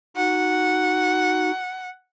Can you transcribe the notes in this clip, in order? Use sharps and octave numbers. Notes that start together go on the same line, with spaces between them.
D#4 F#4 F#5